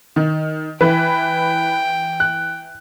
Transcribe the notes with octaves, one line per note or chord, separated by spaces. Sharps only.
D#3
E3 B4 G5
F#6